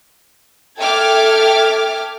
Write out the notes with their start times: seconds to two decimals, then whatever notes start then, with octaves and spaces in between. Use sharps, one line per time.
0.79 A4 E5 G5 D6 F6 G#6